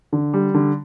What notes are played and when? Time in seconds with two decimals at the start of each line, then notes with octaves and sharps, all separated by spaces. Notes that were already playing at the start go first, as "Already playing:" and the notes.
0.13 D3
0.33 G3
0.54 D3